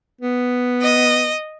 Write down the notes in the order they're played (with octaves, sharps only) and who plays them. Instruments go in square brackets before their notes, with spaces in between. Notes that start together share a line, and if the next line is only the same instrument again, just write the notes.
[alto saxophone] B3
[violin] D#5